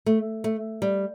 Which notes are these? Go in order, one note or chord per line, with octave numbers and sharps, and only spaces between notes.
A3
A3
G3